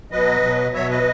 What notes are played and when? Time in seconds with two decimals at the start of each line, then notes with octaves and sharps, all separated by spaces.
0.11 B2 F#3 B4 D#5
0.43 B2 F#3
0.74 B2 F#3 C#5 E5
0.89 B4 D#5